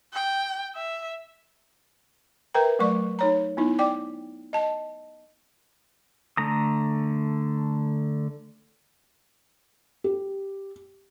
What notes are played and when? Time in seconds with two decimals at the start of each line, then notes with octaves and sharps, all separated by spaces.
0.13 G5
0.75 E5
2.54 A#4 B4 E5 G5 A#5
2.79 F#3 A3 D5 C#6
3.19 D#4 C#5 A#5
3.57 B3 D#4 E4
3.79 D5 G5 D6
4.53 D#5 A5
6.37 D3 A3 A#5 D#6
10.04 G4